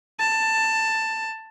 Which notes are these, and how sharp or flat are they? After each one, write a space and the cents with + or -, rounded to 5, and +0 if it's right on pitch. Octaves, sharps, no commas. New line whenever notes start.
A5 +10